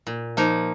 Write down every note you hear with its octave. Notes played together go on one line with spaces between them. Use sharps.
A#2
F3 A#3 D#4